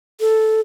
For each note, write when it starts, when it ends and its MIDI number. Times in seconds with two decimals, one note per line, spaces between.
0.21 0.60 69